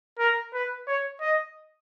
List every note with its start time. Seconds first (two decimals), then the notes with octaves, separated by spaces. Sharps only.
0.19 A#4
0.53 B4
0.87 C#5
1.21 D#5